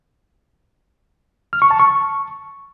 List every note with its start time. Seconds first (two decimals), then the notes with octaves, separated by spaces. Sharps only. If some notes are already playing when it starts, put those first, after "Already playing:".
1.53 F6
1.62 C#6
1.71 A5
1.79 C#6